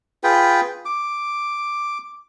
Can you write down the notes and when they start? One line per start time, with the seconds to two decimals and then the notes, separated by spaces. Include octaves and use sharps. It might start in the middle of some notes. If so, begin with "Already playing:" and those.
0.23 F4 G#4 B4 G5
0.85 D6